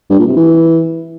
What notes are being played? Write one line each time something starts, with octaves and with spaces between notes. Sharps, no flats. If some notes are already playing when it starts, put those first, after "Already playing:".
G2
A#2
C3
E3